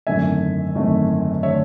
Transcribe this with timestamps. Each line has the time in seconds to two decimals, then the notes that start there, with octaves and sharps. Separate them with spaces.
0.07 G#1 F#2 D3 A3 E5 G#5
0.75 G#1 F#2 D3 A3
1.43 D3 A3 C#5 E5